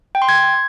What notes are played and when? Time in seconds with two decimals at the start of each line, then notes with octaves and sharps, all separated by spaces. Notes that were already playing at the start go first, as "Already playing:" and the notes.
0.15 G5
0.22 C6
0.29 G#6